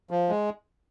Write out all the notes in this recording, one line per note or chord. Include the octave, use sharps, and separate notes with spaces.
F3
G#3